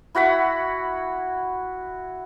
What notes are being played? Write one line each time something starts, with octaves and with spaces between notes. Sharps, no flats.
E4 F#4 F#5 B5